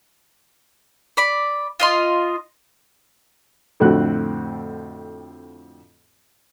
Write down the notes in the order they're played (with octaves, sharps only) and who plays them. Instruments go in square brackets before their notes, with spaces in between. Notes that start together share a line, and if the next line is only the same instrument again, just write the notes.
[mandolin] D5 B5
F4 D#5 C6
[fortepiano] F2 A2 D3 C4 F#4 F#6